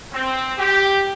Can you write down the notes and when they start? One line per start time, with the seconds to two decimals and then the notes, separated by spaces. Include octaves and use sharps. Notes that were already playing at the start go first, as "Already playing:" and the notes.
0.13 C4
0.58 G4